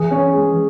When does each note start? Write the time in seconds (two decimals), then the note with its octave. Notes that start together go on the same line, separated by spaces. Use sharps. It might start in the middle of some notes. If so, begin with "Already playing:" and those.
Already playing: E3 G#4
0.11 C#4
0.33 G#3